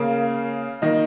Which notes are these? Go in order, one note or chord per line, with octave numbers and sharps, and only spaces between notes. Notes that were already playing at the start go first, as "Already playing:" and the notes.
Already playing: C#3 A#3 F5
D#3 A#3 D#5